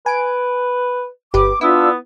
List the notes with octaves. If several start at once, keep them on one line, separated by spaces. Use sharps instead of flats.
B4 G#5 D7
G1 G4 B4 D6
B3 D4 E4 F4 E6